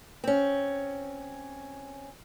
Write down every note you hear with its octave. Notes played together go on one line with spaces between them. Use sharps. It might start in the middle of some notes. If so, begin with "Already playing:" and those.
C4 C#4